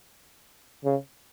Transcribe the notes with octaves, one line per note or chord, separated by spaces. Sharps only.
C#3